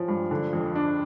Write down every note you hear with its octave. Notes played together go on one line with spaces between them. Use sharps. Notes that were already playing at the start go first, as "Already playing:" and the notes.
Already playing: F3 C#4
G2
D3
F2
D4